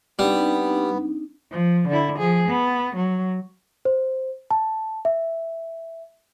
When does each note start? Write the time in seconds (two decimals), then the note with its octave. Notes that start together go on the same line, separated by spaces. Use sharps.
0.19 G3 B3 C4 D4 D#4
1.51 F3
1.89 D3 E4
2.19 F3 G#4
2.49 B3
2.96 F#3
3.85 C5
4.51 A5
5.05 E5